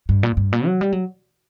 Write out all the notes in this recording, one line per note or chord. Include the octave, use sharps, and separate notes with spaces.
G2
A#2
G2
A#2
F#3
G3
F#3